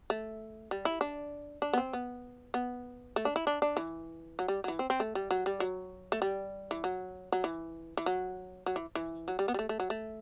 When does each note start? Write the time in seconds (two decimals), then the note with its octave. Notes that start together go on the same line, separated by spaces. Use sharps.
0.10 A3
0.71 G3
0.85 E4
1.01 D4
1.62 D4
1.73 B3
1.78 C4
1.93 B3
2.54 B3
3.16 A3
3.25 D4
3.36 E4
3.47 D4
3.62 D4
3.77 E3
4.39 F#3
4.48 G3
4.64 F#3
4.68 E3
4.79 C4
4.90 C4
5.00 A3
5.15 G3
5.31 F#3
5.46 G3
5.60 F#3
6.12 A3
6.22 G3
6.71 E3
6.84 F#3
7.32 F#3
7.44 E3
7.97 E3
8.06 F#3
8.66 F#3
8.76 E3
8.95 E3
9.28 F#3
9.39 G3
9.48 B3
9.54 G3
9.59 A3
9.69 A3
9.80 F#3
9.90 A3